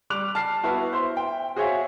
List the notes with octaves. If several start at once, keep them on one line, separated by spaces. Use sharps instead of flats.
G3 D6 F#6 F7
A5 F6 C7
B3 E4 F#4
C5 E5 C6
G5
F#4 G#4 C5 C#5 E5 F5